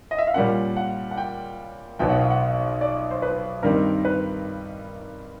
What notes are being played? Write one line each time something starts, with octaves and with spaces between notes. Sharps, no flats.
D#5
E5
F5
A#2 G3 A#3 C#4 F#5
F#5
F#5
G5
B1 B2 F#3 B3 G5
F#5
F5
F#5
D5
C5
B4
G2 D#3 G3 C4 A#4
B4